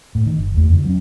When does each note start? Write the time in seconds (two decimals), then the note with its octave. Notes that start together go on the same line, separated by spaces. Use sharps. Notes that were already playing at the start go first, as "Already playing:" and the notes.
0.15 A2
0.26 D#3
0.38 G1
0.55 E2 A3
0.70 F2 D3
0.85 F#3 A#3 C#4